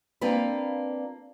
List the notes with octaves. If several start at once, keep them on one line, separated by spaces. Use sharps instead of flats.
A#3 C4 D4 F4 B4